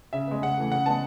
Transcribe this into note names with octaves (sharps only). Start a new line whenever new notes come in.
C#3 E5
G#3 B3
C#3 F#5
E3 A3
C#3 F#5
G#3 B3 A5